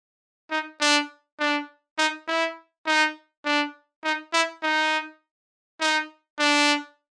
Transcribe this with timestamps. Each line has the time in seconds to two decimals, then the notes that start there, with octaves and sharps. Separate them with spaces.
0.51 D#4
0.81 D4
1.40 D4
1.98 D#4
2.28 E4
2.87 D#4
3.45 D4
4.04 D#4
4.33 E4
4.63 D#4
5.81 D#4
6.39 D4